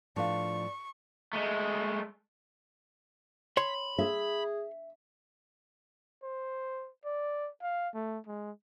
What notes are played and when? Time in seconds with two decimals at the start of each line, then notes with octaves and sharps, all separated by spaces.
0.16 A2 F3 D4 B4 D5 F5 C#6
1.33 G#3 A3
3.57 C#5 B5 C6
3.98 G#4 E5
6.23 C5
7.05 D5
7.62 F5
7.94 A3
8.27 G#3